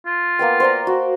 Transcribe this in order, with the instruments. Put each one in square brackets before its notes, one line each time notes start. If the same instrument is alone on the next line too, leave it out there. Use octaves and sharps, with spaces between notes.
[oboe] F4
[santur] A#3 B3 G5
C5 D5 A#5
F#4